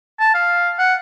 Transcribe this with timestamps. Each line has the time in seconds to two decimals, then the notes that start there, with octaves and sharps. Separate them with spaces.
0.20 A5
0.35 F5
0.79 F#5